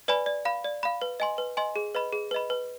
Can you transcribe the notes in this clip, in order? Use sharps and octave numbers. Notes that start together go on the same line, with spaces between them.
B4 D5 G#5 B5
D5
F5 B5
D5
F5 B5
B4
D#5 G#5 C6
B4
D#5 G#5 C6
G#4
B4 D#5 B5
G#4
B4 D#5 B5
B4